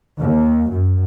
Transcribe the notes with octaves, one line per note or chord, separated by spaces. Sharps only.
D#2
F#2